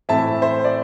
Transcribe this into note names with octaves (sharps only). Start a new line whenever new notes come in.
A2 E3 C4 E5 A5
C5 E5
D5